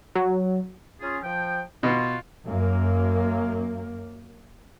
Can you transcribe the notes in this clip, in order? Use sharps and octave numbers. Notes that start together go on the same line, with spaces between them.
F#3
C#4 F4 G#4
F3 G5
B2 F4
F#2 A#3